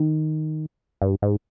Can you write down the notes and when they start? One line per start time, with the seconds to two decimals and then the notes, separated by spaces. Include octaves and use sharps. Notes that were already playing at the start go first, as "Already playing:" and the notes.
Already playing: D#3
1.02 G2
1.22 G#2